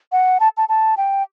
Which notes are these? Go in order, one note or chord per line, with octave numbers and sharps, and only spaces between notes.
F#5
A5
A5
A5
G5